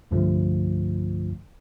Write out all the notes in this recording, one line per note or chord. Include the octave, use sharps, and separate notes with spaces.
C2 G2 D3 F3 A3